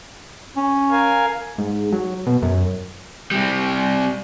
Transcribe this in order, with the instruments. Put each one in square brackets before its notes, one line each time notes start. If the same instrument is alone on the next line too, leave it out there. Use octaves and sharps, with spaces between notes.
[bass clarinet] C#4
[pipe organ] A#4 F5 G#5
[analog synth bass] G#2
F#3
B2
F#2
[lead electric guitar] C3 G3